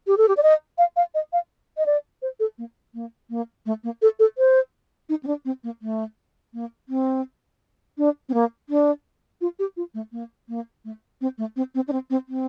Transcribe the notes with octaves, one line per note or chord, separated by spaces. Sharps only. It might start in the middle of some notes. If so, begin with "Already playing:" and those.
G4
A4
G4
D5
D#5
F5
F5
D#5
F5
D#5
D5
C5
A4
A#3
A#3
A#3
A3
A#3
A4
A4
C5
D#4
C4
D4
C4
A#3
A3
A#3
C4
D4
C4
A#3
D4
F4
G4
F4
A3
A#3
A#3
A3
C4
A3
C4
C4
D4
C4
C4
C4